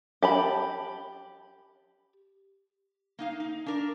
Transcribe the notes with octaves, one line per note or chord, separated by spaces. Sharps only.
G4 A5 B5
A#3 D#4 F5
D#4
D4 A#4 D5